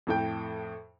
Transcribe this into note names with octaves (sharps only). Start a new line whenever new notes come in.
F2 A2 G5